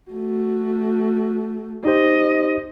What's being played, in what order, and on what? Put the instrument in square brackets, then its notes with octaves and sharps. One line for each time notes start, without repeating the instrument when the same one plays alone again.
[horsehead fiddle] A3 F#4
[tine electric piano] D#4 G4 C5 [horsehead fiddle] D#5